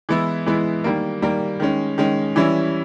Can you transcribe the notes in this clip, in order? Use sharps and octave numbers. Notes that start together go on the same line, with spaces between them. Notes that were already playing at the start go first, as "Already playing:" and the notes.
E3 G#3 B3 E4
E3 G#3 B3 E4
D#3 G3 A#3
D#3 G3 A#3
D#3 G#3 C#4
D#3 G#3 C#4
E3 G3 C#4 E4